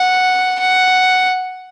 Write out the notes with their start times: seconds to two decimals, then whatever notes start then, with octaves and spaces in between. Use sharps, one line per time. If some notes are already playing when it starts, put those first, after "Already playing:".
Already playing: F#5
0.59 F#5